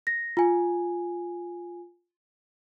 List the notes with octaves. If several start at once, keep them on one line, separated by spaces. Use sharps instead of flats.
A#6
F4 G#5